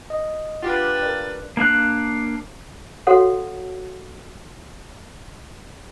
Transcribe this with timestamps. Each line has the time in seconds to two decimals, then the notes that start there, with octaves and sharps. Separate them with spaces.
0.10 D#5
0.63 D4 F4 G4 B4 F#5 A6
1.02 A#4 D5
1.57 A#3 D4 F5 F#6
3.07 F#4 A4 C#5 F5 F#5